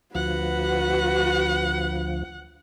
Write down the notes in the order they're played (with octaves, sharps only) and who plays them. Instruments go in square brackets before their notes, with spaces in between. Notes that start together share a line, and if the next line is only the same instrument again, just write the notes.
[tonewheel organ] D2 F3 [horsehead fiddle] F#4 B4 [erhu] F#5